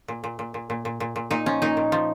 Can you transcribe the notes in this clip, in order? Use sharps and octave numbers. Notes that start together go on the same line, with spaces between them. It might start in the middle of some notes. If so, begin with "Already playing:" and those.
A#2
A#2
A#2
A#2
A#2
A#2
A#2
A#2
A#2 D#4
F3 C#4
A#2 D#4
A#2
F3